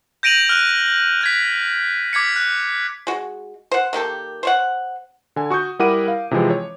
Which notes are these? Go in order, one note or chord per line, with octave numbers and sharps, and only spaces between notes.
G6 A#6 D7 D#7 F7 F#7
F6 F#6
F#6 G#6 B6
D6 G#6 B6 C#7
F#6
G#3 F#4
C5 F#5
D#3 A#3 G4 A4
C5 C#5 F#5
D3 G#5
F#4 C#6 D#6 G6
G3 E4 A#4 F#5 D6 D#7
F5
C3 E3 F3 G#3 C4
C#5